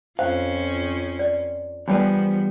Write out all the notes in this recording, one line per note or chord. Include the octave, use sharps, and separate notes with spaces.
F2 C#4 F4 C5 F5
D5
E2 F3 G3 B3 D4 B4 D5 G#5